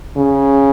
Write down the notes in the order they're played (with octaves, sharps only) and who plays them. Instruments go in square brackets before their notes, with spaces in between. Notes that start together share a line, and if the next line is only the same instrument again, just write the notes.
[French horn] C#3